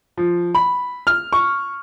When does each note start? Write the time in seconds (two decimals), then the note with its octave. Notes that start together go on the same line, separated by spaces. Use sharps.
0.17 F3
0.55 B5
1.07 F6
1.33 C#6